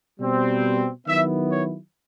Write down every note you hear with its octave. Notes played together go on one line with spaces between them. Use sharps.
B2 G3 C4
D#3 F#3 B3 E4 E5
C#5